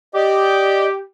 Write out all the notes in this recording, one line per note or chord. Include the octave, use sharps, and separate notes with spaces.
G4 D5 D#5